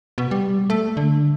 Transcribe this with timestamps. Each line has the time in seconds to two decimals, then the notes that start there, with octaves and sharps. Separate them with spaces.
0.18 B2
0.31 G3
0.70 A3
0.97 D3